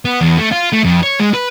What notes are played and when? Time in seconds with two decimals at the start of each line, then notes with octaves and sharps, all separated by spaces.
0.05 B3
0.21 E2
0.38 A3
0.52 F4
0.73 A3
0.84 F2
1.03 C#5
1.20 G#3
1.34 B4